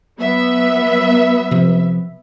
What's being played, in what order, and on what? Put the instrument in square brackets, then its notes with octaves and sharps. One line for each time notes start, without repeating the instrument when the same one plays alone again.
[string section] F#3 B3 E5
[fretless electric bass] C3 F3